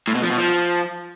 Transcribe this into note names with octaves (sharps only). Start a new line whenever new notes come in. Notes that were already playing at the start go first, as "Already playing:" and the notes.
A2
B2
F3
B2
F3